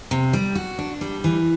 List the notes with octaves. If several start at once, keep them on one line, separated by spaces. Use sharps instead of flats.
C3
G3
F#4
D4
G3
E3